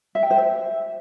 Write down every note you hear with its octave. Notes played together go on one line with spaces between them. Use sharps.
E5
G5
C5
E5